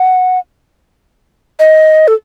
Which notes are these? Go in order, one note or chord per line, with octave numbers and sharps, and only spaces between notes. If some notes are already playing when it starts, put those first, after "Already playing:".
Already playing: F#5
D#5
A4